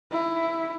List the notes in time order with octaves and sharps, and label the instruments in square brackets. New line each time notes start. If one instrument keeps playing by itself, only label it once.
[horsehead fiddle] E4